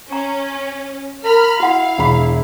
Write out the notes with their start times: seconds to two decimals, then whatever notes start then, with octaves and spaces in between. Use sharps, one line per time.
0.12 C#4 A#5
1.24 A#4 B5 F6
1.60 E4 F#4 F5 F#5
1.98 E1 B5